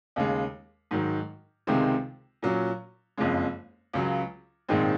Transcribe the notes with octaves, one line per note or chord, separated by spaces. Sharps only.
D#2 C#3 G#3
G#2 D#3 F#3
C#2 C3 D#3 G#3 C4
A#2 F#3 C#4
F#1 F2 C#3 G#3
C#2 C#3 F#3
A#1 G#2 D#3 G#3 C4